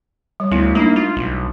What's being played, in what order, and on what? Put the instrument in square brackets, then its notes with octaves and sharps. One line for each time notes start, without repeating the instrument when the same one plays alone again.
[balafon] G3 C#5
[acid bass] D2 [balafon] A3 B3 E4
[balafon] G#3 D4 D#4 [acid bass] A#3
[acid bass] F4
B1